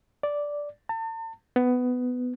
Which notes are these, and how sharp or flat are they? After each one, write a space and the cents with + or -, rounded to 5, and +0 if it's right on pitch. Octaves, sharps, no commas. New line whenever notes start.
D5 -5
A5 +40
B3 +15